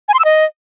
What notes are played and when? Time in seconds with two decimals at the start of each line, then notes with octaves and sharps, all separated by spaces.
0.09 G#5
0.14 C6
0.19 E6
0.25 D#5